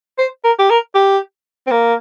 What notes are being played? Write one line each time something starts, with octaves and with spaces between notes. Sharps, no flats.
C5
A#4
G4
A#4
G4
C4
A#3